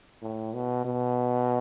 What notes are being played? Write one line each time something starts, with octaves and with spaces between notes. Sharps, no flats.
A2
B2
B2